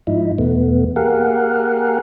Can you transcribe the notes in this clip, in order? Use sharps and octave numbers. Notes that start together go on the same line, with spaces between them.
G#2 F3 D#4 E4
E2 B2 A3 B3
A#3 G4 G#4 A#4 F5 F#5